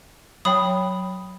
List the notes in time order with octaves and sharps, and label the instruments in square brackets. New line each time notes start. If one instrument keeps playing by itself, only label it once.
[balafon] F#3 C#5 G5 [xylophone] B5 D#6